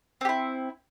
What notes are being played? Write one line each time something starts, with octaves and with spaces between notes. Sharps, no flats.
C4 E4 G4